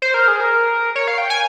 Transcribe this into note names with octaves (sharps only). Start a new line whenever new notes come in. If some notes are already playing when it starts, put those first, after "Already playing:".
C5
A#4
G#4
A#4
C#5
F5
G5
G#5